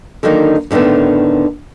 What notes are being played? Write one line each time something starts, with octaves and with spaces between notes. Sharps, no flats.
D3 D#3 F#3 A#3 D#4 A#4
A2 D3 D#3 A3 B3